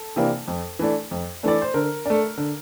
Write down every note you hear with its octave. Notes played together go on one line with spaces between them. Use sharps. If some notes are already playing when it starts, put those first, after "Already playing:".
Already playing: A4
C3 E3 A#3 D4
F2
E3 A3 D4
F2
E3 A3 D4 D5
C5
D3 A#4
A3 D4
D3